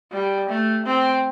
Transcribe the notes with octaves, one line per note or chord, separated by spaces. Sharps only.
G3
A3
C4